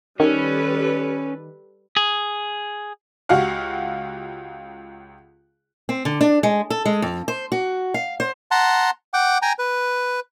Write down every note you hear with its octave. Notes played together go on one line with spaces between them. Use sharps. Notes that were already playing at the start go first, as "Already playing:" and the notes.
D#3 G3 C#4 A4 B4
G#4
C#2 F#4 G4 F5 F#5
C4
D3
D4
G#3
A4
G#3
F2
C5
F#4
F5
C5
F#5 A5 A#5 C6
F#5 G5 D6
G5 G#5 A#5
B4